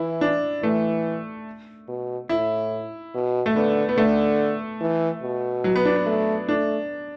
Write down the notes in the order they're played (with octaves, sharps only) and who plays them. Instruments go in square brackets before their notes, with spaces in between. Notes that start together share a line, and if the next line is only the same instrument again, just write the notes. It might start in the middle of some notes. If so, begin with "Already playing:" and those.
Already playing: [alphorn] E3 [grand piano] E4
[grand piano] D4
[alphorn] E3 [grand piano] A3
[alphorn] B2
[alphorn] A2 [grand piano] E4
[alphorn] B2
[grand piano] A3
[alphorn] D3 [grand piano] B3
[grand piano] B3
[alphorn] D3 [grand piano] A3
[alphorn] E3
B2
[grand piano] F#3
B3
D4
B3
[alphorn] A3
[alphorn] A3 [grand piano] D4